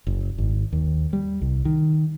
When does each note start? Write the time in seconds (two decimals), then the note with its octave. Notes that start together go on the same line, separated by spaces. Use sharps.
0.07 F#1
0.38 G#1
0.73 D#2
1.13 G3
1.42 C2
1.65 D#3